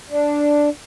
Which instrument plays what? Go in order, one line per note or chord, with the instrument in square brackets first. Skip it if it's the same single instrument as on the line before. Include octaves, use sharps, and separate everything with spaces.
[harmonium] D4